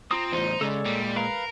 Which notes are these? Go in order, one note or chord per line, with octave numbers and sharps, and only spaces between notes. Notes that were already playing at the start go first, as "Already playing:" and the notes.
C4 F4 A#5 D#6
E2 A2 D#4 C5
C#3 G#3 A4 C#5 D5
A#2 G3
A#4 B4 F5 A#5